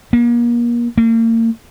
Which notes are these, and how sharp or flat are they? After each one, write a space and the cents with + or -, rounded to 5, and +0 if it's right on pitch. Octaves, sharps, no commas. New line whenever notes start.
A#3 +35
A#3 -40